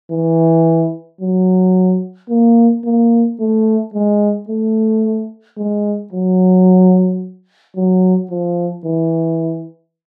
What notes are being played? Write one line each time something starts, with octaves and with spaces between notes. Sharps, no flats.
E3
F#3
A#3
A#3
A3
G#3
A3
G#3
F#3
F#3
F3
E3